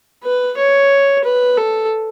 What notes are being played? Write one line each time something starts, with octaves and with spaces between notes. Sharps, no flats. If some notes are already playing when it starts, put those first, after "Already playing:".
B4
C#5
B4
A4